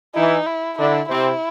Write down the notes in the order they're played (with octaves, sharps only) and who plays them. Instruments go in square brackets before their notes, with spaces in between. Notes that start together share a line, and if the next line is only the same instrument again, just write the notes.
[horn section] E3 E4 [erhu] D#4
[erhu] E4
[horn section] D3 D4 [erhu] E4
[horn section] C3 C4 [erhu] E4